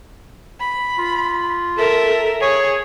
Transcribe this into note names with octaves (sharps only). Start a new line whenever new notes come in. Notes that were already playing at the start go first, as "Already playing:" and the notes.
B5
F4
A4 A#4 E5
G#4 C#5